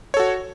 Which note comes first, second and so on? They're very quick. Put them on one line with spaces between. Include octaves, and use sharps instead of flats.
C#5 A4 F#4